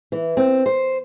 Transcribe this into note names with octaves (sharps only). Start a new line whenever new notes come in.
E3
C4
C5